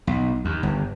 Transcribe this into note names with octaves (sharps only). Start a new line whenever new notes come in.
B1
D#2
G1